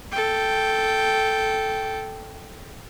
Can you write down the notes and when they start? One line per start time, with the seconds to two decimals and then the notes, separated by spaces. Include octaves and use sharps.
0.12 A4 G5